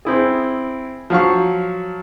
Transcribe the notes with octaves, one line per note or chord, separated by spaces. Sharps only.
C4 E4 G#4
F3 F#3 F5 C#6